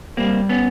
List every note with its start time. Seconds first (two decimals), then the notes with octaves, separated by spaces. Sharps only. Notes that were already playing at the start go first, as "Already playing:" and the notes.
0.17 G3 A#3 C4
0.49 B3 C#4